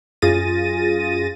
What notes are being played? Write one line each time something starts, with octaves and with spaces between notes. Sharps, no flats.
F#2 F4 G#4 A6 A#6 D#7